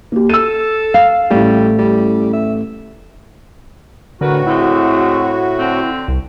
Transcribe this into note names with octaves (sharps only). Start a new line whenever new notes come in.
A#3 G4
A4 E6 D#7
F5
A1 G3 A3
G3
E5
A2 D3 F#4 A#4 B4
G#3 A3 C4 E4
D3 C4
C2